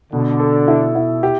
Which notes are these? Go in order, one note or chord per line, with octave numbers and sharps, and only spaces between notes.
B2 D3
A4
E4
E4
G4